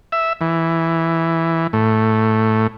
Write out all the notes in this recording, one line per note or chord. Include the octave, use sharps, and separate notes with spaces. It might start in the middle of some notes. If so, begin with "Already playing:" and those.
E5
E3
A2